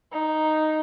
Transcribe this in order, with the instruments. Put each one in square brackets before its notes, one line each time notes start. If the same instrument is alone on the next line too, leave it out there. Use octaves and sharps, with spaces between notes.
[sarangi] D#4